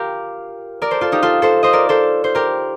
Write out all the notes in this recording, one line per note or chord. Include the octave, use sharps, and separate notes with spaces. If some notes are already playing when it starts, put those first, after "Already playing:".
Already playing: F4 G4 A#4
A#4 D5
A4 C5
F4 A4
D#4 G4
F4 A4
A4 C5
C5 D#5
A#4 D5
A4 C5
C5
G4 A#4